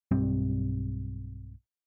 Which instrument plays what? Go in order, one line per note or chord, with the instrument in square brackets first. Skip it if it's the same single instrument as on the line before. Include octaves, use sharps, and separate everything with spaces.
[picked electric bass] B1 G2 G3 C4